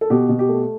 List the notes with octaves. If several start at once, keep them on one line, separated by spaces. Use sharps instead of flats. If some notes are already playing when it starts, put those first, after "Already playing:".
A4
B2 G4
B2
G4
A3